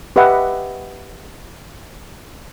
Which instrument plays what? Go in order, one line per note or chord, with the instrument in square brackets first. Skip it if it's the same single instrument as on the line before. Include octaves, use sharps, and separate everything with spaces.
[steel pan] G4 B4 D#5 E5 F#5